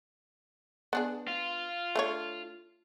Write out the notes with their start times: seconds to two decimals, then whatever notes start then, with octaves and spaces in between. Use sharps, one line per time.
0.93 B3 D4 G#4
1.28 F4
1.96 A3 D4 C#5